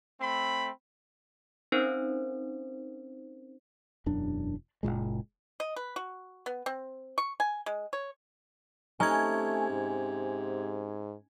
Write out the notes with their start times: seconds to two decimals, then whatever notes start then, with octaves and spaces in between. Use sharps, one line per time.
0.21 A3 C4 B5
1.72 C4 C#4 D#4 A#4 C5
4.06 E1 F#2 D4
4.83 F#1 C2 A#2 G#3
5.60 D#5
5.76 B4
5.96 F#4
6.46 B3
6.66 C4
7.18 C#6
7.40 G#5
7.66 G#3
7.93 C#5
9.00 C3 A3 C#4 D#4 G#5 G#6
9.71 G#2